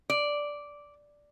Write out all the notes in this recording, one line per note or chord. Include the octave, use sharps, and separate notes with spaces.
D5